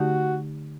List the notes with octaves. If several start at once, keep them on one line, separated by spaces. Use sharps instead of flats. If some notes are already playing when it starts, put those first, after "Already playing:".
Already playing: D3 A3 D#4 F#4 G4